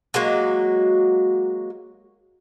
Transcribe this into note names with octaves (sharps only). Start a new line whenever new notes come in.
F#3 G#3 A#3 F#4